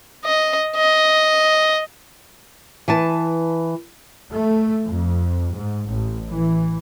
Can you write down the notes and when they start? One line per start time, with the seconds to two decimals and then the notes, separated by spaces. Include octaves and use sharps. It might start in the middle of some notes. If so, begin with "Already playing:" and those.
0.25 D#5
0.76 D#5
2.88 E3 B4 A5
4.33 A3
4.86 F2
5.53 G#2
5.88 A1
6.29 E3